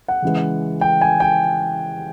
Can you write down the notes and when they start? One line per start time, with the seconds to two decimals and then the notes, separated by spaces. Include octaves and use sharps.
0.08 F#5
0.22 C#3 E3 G#3
0.81 G5
1.01 G#5
1.20 G5